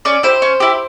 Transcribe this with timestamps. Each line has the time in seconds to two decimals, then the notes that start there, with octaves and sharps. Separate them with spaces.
0.05 C#4 D5
0.23 E4 G4 C5
0.42 C#4
0.60 E4 G4